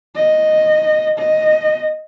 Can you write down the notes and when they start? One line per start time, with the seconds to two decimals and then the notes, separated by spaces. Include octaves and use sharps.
0.15 D#5
1.18 D#5